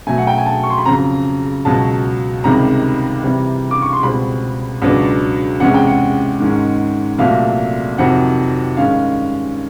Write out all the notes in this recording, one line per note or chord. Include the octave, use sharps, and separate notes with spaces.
B2 F#3 A3 G#5
F#5
G5
G#5
A5
C#6
C6
B5
F2 C#3 F#3 A#5
C#2 B2 F#3 A5
C#2 C3 D#3 G3 A#5
C3 E3 G3
D6
C#6
C6
C#2 B2 G3 C4 B5
C#2 B2 F#3 B3 D4
E2 C3 E3 G#3 C#4 F#5
G5
F#5
G#2 D#3 G#3 C#4
C2 A#2 F#3 A3 F5
F2 C3 D#3 F#3 F#5
G2 D#3 G#3 C#4 F5